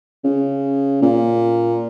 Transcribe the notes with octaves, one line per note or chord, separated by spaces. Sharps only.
C#3
A#2